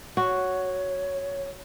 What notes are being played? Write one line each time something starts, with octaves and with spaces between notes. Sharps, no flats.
F#4 C#5